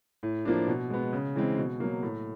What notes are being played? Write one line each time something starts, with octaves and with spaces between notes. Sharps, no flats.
A2
F3 A#3 D4
B2
G#3 B3
C#3
E3 G#3 C4
B2
F#3 A#3
A2